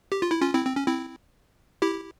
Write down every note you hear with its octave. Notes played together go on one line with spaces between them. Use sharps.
G4
F4
E4
C#4 F4
C4 E4
C4
C#4
C4 E4
E4 G4